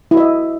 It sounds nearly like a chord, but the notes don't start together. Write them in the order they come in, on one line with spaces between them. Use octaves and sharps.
E4 F#4 E5 D#5